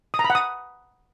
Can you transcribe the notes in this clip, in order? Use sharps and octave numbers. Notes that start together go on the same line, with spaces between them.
D#6
A#5
B5
F#5
D#6